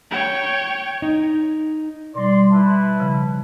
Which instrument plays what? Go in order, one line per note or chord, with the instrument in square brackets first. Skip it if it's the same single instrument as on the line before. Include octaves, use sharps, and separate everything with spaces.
[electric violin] C#5 G5
[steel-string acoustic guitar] D#4
[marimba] B2 G3 [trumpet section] D5 C6
[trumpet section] E4 B4 A5
[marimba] C#3 F3